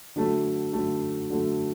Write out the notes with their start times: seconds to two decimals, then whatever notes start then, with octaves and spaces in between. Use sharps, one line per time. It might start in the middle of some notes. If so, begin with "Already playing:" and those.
0.16 D3 F#3 A3
0.73 D3 F#3 A3
1.30 D3 F#3 A3